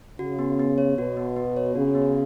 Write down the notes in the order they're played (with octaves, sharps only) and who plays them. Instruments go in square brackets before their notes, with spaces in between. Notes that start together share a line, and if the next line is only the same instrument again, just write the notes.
[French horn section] C#3 [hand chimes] F#4
[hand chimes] B3
B3
C#5
[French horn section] B2 [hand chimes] F#4
[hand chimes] B3
B3
C#5
[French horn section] C#3 [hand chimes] F#4
[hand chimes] B3